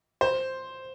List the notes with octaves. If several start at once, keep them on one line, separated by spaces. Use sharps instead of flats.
C5